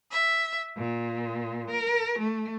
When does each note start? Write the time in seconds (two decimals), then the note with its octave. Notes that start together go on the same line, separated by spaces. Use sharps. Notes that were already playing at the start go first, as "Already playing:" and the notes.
0.11 E5
0.76 A#2
1.70 A#4
2.19 A3